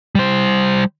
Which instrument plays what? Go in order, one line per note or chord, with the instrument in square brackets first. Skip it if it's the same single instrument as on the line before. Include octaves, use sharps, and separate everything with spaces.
[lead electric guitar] G3 C5